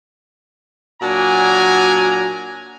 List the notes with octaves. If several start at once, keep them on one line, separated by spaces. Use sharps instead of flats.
A#2 F#3 D4 F#4 G#5 A#5